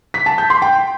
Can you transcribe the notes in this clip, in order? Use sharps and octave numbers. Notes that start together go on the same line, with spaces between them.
B6
A5
G6
C6
G5